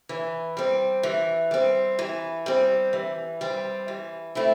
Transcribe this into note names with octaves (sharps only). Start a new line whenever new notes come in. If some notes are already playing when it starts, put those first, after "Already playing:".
E3
G3 C4
E3
G3 C4
E3
G3 C4
E3
G3 C4
E3
A3 C4 E4